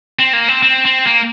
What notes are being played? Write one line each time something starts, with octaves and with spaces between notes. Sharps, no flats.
C4
A#3
C4
C4
C4
A#3